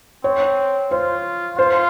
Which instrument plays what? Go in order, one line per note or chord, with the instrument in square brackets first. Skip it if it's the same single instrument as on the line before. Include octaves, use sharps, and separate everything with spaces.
[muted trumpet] C4 [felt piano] C#5
[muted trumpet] F4 [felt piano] C5
[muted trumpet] F4 [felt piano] C5